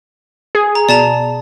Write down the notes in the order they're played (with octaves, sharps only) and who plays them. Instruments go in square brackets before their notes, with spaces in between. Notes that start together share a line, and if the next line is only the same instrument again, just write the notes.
[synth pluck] G#4
[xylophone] A#5
[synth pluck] B2 [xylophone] D5 A5 A#5